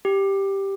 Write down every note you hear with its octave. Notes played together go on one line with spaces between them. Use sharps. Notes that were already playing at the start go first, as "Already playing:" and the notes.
G4